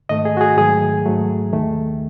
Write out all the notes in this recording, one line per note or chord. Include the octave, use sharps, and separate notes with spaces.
G#2 D#3 A3 D#5
G#4
F#4
G#4
G#2 D#3 F#3 A3 G#4
G#2 F#3 A3
D#2 D#3 A3